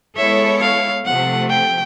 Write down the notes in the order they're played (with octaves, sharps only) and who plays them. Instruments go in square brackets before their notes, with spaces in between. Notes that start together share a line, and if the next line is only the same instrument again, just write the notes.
[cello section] G#3 B3 E4 A4 C#5 [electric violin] E5
[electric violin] F5
[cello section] C3 F3 A3 [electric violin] F#5
[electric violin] G5